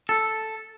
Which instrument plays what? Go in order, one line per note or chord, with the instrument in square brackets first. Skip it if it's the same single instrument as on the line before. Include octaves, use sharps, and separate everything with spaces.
[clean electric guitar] A4